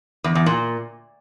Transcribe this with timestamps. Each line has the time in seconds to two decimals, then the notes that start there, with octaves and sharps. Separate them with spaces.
0.24 E2
0.35 E2
0.46 A#2